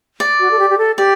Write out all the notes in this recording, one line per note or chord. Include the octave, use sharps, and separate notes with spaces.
D5
F#4
A4
G4
G4
A4
G4 D5